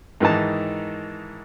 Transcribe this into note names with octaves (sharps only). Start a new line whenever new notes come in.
G#2 D#3 E3 D#4 A5